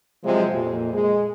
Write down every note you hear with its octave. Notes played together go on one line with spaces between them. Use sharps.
C3 F3 F#3 G#3 C4
F2 A#2
G#3